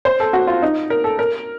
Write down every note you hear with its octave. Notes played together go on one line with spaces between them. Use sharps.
C5
A4
F#4
F4
D#4
A#4
A4
A#4